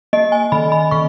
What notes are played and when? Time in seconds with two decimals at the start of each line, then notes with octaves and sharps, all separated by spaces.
0.13 A#3 D#5
0.32 G#5
0.52 D#3 B5
0.72 B5
0.91 D#3 C#6